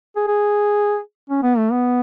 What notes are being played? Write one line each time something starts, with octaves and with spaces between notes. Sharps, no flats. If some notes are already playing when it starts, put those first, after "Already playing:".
G#4
G#4
C#4
B3
A3
B3